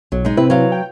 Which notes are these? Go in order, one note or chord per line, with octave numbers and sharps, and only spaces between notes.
B1 F#3
G#3 D#4
C3 C4 E4 B4
F#3 F5
G5